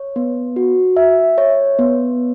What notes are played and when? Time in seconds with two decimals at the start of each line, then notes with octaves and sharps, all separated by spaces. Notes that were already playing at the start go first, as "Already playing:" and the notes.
Already playing: C#5
0.16 B3
0.56 F#4
0.97 E5
1.38 C#5
1.79 B3